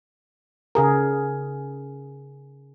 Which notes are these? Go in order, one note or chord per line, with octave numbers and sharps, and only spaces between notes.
C#3 G#4 A#4